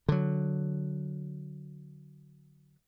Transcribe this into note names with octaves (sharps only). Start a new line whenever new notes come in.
D3 F#3